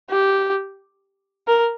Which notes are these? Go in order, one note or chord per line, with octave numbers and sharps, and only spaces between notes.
G4
A#4